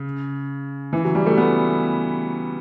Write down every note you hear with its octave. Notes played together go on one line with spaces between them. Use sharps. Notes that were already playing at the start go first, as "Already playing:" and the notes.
Already playing: C#3
E3
F#3
G3
A3
B3